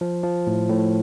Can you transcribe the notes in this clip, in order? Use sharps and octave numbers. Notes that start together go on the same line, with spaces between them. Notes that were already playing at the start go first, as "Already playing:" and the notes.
F3
F3
A2
A2